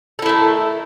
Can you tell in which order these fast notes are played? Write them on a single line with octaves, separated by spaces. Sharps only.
A4 E4 A3 D#3